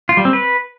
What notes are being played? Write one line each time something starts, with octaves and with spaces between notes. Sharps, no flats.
F4
G3
C4
B4